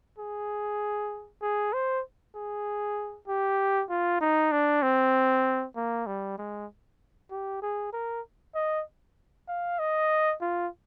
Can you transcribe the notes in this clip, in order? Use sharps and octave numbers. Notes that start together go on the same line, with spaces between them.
G#4
G#4
C5
G#4
G4
F4
D#4
D4
C4
A#3
G3
G#3
G4
G#4
A#4
D#5
F5
D#5
F4